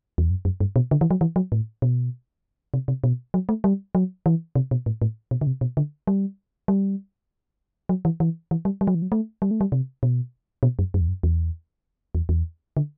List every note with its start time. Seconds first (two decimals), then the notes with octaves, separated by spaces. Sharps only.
0.18 E2
0.30 F#2
0.45 F#2
0.60 G2
0.76 B2
0.91 D3
1.01 E3
1.11 F#3
1.21 E3
1.36 F#3
1.52 A2
1.82 B2
2.74 C3
2.88 C3
3.04 B2
3.34 F#3
3.49 A3
3.64 G3
3.95 F#3
4.26 E3
4.56 C3
4.71 B2
4.86 A2
5.02 A2
5.31 B2
5.41 D3
5.47 C3
5.61 B2
5.77 D3
6.07 G3
6.68 G3
7.89 F#3
8.05 E3
8.20 E3
8.51 E3
8.65 G3
8.81 G3
8.87 F#3
8.95 E3
9.02 F#3
9.12 A3
9.42 G3
9.51 A3
9.61 G3
9.72 C3
10.03 B2
10.63 B2
10.79 F#2
10.94 F#2
11.01 E2
11.08 F#2
11.23 E2
12.15 E2
12.29 E2
12.77 D3